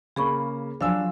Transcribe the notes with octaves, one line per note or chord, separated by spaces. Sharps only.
C#3 A#3 G#4 B5 C#6
F3 F#3 D4 F4 F5 G#5 E6